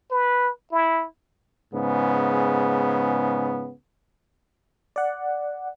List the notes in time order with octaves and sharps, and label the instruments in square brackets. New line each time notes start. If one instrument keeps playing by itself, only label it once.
[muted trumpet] B4
E4
[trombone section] G#2 C#3 B3
[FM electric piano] D5 F#5